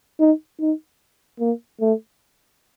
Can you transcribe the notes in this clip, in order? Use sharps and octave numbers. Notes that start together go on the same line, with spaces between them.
D#4
D#4
A#3
A3